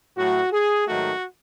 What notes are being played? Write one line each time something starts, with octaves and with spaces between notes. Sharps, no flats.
A2 F#3 A3 F#4
G#4
G#2 D#3 F#3 A3 F#4